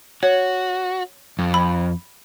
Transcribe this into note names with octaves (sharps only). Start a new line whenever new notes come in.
F#4 C#5
F2
B5